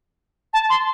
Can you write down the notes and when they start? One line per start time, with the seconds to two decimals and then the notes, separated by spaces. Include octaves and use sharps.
0.53 A5
0.70 C6